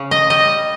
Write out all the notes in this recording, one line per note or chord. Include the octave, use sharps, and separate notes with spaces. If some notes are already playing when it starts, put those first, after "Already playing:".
Already playing: C#3
D#5
G3 D#5